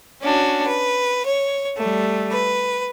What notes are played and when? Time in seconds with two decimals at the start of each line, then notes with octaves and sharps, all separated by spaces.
0.22 C#4 D4 F#4
0.65 B4
1.25 C#5
1.78 G3 A3
2.32 B4